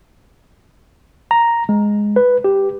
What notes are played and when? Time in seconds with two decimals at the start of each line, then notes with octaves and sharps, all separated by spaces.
1.31 A#5
1.69 G#3
2.16 B4
2.44 G4